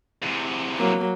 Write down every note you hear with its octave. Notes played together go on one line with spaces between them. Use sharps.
E2 C3
F#3 A#3